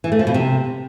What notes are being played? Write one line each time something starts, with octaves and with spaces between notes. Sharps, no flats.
E3
A3
F3
B2
C3